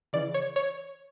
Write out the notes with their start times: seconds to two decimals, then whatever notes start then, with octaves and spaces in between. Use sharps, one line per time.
0.13 C#3 E3 D5
0.34 C#5
0.56 C#5